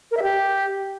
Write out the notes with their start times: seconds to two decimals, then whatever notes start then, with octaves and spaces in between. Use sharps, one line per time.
0.11 A#4
0.17 E5
0.22 G4